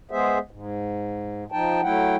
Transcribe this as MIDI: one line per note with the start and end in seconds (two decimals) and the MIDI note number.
0.11 0.38 56
0.11 0.38 59
0.11 0.38 68
0.11 0.38 72
0.11 0.38 76
0.51 1.44 44
1.52 1.81 53
1.52 1.81 63
1.52 1.81 79
1.52 1.81 81
1.83 2.16 54
1.83 2.16 57
1.83 2.16 64
1.83 2.16 78
1.83 2.16 79